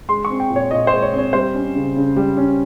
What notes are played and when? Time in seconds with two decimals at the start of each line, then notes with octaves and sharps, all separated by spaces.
0.09 G#3 C6
0.25 C#6
0.30 C4
0.40 G5
0.50 A#2
0.56 C#5
0.71 A#2 D#5
0.87 C5
0.92 G#3
1.02 C#5
1.13 C4 C#5
1.33 G3 C5
1.55 C#4
1.75 C#3
1.96 C#3
2.16 G3
2.37 C#4